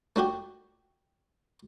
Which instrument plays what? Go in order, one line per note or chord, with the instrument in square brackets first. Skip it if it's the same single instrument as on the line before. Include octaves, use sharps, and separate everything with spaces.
[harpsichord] A3 D4 F#4 G4